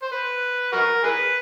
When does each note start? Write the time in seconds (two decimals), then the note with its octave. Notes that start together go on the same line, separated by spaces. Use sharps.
0.02 C5
0.12 B4
0.72 F#4 A#4
1.03 G#4 B4